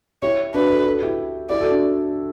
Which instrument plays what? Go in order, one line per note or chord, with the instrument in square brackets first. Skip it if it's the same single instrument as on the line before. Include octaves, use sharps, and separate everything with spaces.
[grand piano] E4 G4 [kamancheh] C#5
[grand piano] D4 F#4 [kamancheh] B4
[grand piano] F#4 A4
F#4 A4
E4 G4
[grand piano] E4 G4 [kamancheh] D5
[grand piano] F#4 A4
D4 F#4